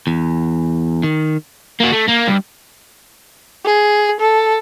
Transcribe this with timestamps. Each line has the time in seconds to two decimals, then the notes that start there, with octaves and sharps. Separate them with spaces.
0.07 E2
1.03 D#3
1.80 A#3 F#4
1.93 A3
2.09 A#3
2.28 G2
3.65 G#4
4.20 A4